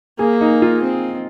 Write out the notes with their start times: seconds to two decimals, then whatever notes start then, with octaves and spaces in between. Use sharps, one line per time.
0.19 A#3 G#4
0.41 D#4
0.62 F4
0.83 C4